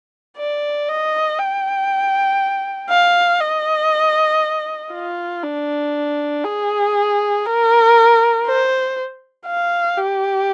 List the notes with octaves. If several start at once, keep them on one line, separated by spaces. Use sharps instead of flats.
D5
D#5
G5
F5
D#5
F4
D4
G#4
A#4
C5
F5
G4